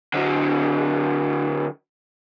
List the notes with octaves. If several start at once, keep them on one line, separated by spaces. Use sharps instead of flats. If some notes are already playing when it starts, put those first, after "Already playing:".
D3 F#3